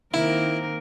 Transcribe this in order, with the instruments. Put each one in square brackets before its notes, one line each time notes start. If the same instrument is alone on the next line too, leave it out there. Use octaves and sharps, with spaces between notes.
[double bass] D#3 [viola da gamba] A#3 C4 A#4 [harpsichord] E4